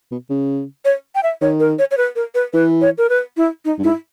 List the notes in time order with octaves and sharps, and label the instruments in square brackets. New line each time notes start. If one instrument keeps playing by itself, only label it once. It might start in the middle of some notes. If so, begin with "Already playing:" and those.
[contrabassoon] B2
C#3
[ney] C#5
G5
E5
[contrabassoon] D#3 [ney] C#5
[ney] A#4
C#5
C#5
B4
A#4
B4
[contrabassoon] E3 [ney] B4
[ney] C#5
A#4
B4
E4
D#4
[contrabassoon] G2
[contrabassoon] G#2 [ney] E4